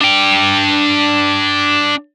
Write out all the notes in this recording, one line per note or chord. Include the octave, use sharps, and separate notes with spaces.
D4 G5